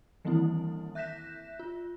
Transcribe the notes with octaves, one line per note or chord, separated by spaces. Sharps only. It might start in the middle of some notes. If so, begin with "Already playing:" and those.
D#3 E3 G3 A#3 C4 E4
E5 F#6 G6 A#6 B6 E7
F4